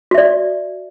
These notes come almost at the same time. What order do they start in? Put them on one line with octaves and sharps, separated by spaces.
F#4 E5 D5